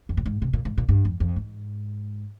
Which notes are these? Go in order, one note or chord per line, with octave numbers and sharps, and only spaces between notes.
F2
A#2
G#2
C3
A#2
G#2
A#2
G2
F2
F2
G#2